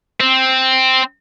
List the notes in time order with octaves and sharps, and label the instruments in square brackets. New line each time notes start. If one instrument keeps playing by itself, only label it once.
[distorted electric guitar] C4